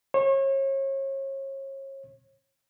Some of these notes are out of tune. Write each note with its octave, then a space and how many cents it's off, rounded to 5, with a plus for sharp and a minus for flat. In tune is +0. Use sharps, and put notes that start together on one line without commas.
C#5 -35